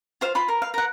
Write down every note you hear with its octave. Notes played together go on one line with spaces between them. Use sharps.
F4 C5 F5
F4 B5 C6
A#4
F5
A#4 F#5